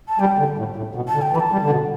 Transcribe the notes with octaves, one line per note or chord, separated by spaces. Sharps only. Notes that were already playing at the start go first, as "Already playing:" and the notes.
A5
G3 G5
D3
A2
A2
B2
A5
D3
G5
E3
B5
A5
G3
D3
B2